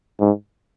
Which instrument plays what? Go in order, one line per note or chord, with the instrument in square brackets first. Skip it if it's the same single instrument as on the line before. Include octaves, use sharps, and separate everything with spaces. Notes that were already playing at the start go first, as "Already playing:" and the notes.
[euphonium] G#2